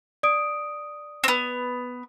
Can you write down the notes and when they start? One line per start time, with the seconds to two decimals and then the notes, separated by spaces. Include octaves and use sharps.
0.23 D5 D#6 D7
1.24 B3 C4